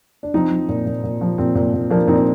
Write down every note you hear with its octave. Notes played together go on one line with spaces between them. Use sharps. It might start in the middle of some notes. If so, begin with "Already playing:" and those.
D4
F3 C4 D#4
F3
A#2
A#2
A#2
F3
A#2 C4
A#2
A#2
F3 A#3 D4
A#2 C4 D#4